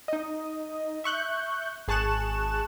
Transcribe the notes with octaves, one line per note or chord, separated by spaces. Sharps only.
D#4 D#5
E5 C#6 F#6 G6
G#1 G#4 A5 C#6 F#6 E7